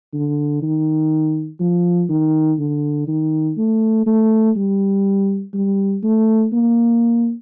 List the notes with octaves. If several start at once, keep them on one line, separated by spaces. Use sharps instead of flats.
D3
D#3
F3
D#3
D3
D#3
A3
A3
G3
G3
A3
A#3